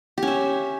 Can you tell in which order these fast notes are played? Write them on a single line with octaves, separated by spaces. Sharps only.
G4 C#4 E5